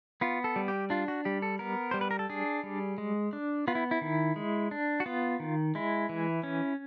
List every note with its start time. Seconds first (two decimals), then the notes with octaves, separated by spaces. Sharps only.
0.21 B3 F4
0.44 A4
0.56 G3
0.68 G4
0.90 D4 F4
1.08 F#4
1.25 G3 G4
1.42 A4
1.59 B3 A#4
1.91 G3 C5
2.01 B4
2.11 A#4
2.19 A4
2.30 D4 G#4
2.63 G3
2.98 G#3
3.33 D4
3.68 B3 F4
3.75 E4
3.91 E4
4.01 D#3
4.36 G#3
4.71 D4
5.00 F#4
5.06 B3 F4
5.40 D#3
5.75 G#3 E4
6.09 E3
6.43 C#4